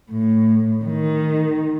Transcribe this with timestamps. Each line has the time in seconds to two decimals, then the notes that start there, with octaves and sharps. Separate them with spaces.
0.12 A2
0.85 D#3